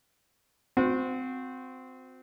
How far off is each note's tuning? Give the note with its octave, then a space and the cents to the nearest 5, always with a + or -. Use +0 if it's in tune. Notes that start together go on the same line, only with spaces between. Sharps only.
C4 -20 F#4 -35